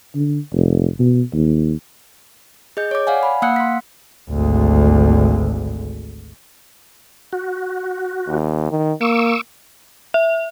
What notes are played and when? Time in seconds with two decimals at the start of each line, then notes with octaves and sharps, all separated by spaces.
0.15 D3
0.53 F1
1.00 B2
1.33 D#2
2.77 G#4 D#5 G6
2.91 C#5 D6
3.07 D5 F5 F#5 G#5
3.23 B5
3.42 A#3 F5 F#5 E6 F#6 C#7
3.56 C6 B6
4.30 G#1 D2
7.33 F#4
8.28 D#2
8.71 D#3
9.01 A#3 C#6 D6 E6
10.14 E5